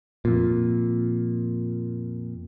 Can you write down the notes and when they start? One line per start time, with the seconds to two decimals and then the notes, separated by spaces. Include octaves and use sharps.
0.25 F2 A#2